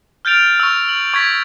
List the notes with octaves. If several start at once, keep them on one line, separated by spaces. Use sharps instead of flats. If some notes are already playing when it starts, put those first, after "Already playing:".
F6 G6 A6 D7 F7
C#6 E6
F#7
C#6 G#6 A6 B6